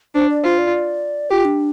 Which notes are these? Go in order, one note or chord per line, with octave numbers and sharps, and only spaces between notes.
D4 C5
D5
F4 C5
D5
F4 G4
D4